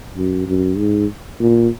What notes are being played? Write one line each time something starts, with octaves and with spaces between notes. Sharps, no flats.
F#2
F#2
G#2
A#2